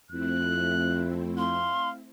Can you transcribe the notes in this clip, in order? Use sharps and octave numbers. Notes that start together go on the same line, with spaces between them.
F2 A3 C4 E4 F#6
F5 C6